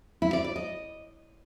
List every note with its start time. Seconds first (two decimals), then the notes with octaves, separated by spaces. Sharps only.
0.22 E4
0.33 D5
0.44 D5
0.56 D#5